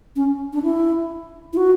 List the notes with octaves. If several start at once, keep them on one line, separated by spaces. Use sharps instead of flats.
C#4
D4
E4
E4
F#4